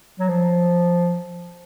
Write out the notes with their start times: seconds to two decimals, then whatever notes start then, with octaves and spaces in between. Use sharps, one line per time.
0.19 F#3
0.29 F3